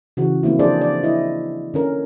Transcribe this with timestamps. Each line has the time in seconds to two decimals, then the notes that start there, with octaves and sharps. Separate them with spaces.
0.17 C#3 E3 F#4
0.43 F3 A#3 C4 E4
0.59 F3 D4 G#4 C5 D5
0.81 D5
1.03 E4 D#5
1.74 D3 C#4 A#4